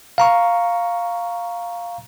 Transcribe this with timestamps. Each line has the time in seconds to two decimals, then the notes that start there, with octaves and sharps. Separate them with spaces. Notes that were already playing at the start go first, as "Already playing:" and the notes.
0.18 F5 A#5 C#6